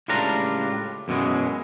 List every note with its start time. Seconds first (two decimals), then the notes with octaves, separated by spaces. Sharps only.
0.08 C#2 A2 G3 D4 F4 A#5
1.08 F#2 B2 E3 G#3